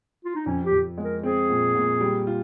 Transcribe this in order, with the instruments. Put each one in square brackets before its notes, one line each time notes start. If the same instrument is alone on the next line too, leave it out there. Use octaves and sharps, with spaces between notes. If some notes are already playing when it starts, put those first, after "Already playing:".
[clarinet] F4
D#4
[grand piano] F2 [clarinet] C#4
[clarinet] G4
[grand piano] F2
G#3
[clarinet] A#4
[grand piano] C4 [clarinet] G#4
[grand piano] A#2
A#2
G3
F4